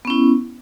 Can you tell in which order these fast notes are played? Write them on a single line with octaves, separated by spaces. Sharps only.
B3 C#4 E4